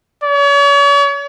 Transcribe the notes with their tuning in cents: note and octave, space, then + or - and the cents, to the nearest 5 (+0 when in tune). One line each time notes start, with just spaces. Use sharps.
C#5 +40